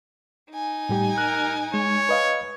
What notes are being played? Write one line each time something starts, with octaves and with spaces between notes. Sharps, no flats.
D#4 G#5
A2 G3 G4
A#4 F#6
G#3 C#5
B4 D#5 F5